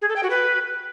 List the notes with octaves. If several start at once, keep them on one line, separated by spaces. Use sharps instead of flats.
G#4
A4
G5
F#4
B4